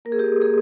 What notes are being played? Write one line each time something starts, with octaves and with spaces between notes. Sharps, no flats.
A#3 A#4
G#4
G4
G#4
A#3 G#4